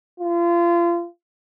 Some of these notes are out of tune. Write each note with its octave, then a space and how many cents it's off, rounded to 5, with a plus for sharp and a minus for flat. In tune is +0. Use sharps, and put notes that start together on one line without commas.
F4 -30